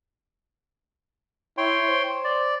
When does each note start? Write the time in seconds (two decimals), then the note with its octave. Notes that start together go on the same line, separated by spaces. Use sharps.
1.58 E4 C#5 G5 C6
1.89 C5
2.24 D5